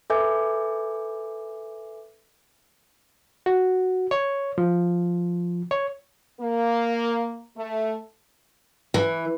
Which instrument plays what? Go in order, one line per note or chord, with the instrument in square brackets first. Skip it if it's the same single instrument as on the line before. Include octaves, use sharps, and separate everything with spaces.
[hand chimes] A4 B4 E5 G#5 D6 G6
[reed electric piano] F#4
C#5
F3
C#5
[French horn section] A#3
A3
[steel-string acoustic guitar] E3